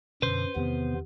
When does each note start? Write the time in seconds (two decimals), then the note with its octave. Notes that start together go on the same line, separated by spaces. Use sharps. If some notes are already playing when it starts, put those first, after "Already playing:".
0.22 F#2 B2 D3 B4 C5
0.56 E2 C3 D#3 B3 C4